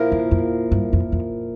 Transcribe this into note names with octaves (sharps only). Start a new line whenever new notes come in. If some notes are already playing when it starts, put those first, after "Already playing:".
Already playing: A#2 F3 A#3 E4 A#4
E2
F2
G2
F2
F2